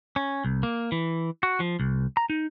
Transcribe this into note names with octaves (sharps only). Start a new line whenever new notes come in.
C#4
C2
A#3
E3
F#4
F3
C2
A#5
D#4